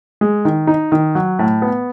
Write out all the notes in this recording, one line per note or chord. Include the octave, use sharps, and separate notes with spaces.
G#3
D#3
D#4
D#3
F#3
A2
B3